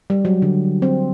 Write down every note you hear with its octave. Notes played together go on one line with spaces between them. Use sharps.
G3
F#3
D3
C4